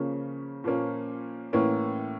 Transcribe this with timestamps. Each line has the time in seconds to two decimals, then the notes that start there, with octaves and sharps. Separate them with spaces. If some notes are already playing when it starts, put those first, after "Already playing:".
Already playing: C#3 F3 A#3 C#4
0.64 A#2 F3 A#3 C#4
1.53 A2 E3 A#3 C#4